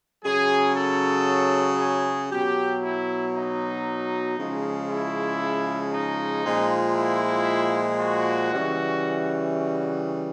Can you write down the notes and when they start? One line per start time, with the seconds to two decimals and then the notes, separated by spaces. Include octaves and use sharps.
0.24 C#3 F#3 G#4
0.76 A4
1.79 G#4
2.31 B2 F#3 G4
2.83 E4
3.35 D#4
4.38 C#3 F3 G#3
4.90 E4
5.93 D#4
6.45 A#2 F3 G#3
6.97 E4
8.00 F#4
8.52 C#3 E3 G3
9.55 F#4